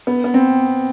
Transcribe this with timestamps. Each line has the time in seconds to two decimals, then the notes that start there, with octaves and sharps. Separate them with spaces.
0.07 B3
0.24 B3
0.34 C4